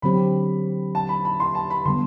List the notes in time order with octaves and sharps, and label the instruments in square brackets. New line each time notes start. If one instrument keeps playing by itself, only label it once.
[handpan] D3 F#3 C4 G4 [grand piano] B5
[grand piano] A5
B5
B5
C6
A5
B5
[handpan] D3 G3 B3 [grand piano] C6